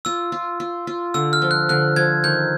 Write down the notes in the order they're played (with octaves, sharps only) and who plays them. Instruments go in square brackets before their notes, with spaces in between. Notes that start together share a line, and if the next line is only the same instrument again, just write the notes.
[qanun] F4 [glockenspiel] E6
[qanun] F4
F4
F4
[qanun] D3 [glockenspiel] E6
[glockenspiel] F6
[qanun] F3
[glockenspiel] F#6
[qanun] D3 [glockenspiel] F#6
[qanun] F3 [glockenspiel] G#6
[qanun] D#3 [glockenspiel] G6